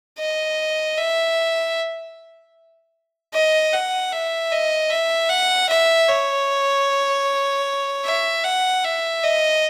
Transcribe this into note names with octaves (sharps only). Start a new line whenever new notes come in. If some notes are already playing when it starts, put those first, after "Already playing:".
D#5
E5
D#5
F#5
E5
D#5
E5
F#5
E5
C#5
E5
F#5
E5
D#5